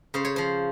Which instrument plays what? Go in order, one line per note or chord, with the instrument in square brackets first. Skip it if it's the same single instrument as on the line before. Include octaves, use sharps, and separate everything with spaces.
[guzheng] C#3 C5
C#5
F3 C5